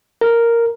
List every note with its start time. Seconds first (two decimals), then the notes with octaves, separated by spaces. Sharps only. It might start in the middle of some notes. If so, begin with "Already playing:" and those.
0.21 A#4